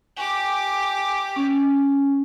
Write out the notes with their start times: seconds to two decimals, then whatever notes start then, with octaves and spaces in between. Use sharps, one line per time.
0.17 G4 G#5 D6
1.36 C#4